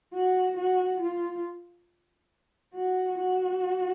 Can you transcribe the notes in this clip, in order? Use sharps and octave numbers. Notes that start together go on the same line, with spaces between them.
F#4
F#4
F4
F#4
F#4